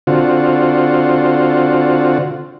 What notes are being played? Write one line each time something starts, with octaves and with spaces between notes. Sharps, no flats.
D3 C4 F4 F#4